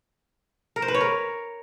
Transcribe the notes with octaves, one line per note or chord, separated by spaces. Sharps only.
A#4
C5
B4
C#5
A#4